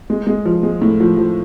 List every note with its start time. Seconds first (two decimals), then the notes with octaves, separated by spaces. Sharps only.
0.10 G#3
0.27 G#3
0.45 F3
0.63 G#3
0.82 A2
1.00 F3
1.17 F3